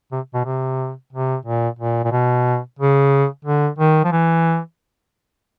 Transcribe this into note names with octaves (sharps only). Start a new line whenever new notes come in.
C3
B2
C3
C3
A#2
A#2
A#2
B2
C#3
D3
D#3
F3
E3